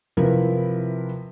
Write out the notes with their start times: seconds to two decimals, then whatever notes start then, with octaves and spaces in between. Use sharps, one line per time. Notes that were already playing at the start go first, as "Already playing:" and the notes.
0.17 C3 F3 E4 A#4 B4